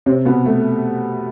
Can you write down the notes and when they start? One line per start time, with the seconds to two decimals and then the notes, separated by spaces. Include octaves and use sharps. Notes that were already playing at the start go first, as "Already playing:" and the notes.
0.06 C3 C4
0.25 B2 B3
0.46 A3